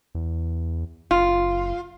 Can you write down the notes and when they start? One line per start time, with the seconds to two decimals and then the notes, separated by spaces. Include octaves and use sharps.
0.15 E2
1.11 F#1 F4